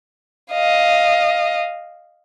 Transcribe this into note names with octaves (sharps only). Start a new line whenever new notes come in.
D#5 F5